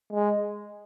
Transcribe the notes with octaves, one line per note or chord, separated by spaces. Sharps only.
G#3